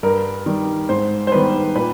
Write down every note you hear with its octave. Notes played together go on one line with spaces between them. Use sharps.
G2 A#4
D#3 G3
G#2 C5
C5
D#3 G3 B3 B4
A#2 B4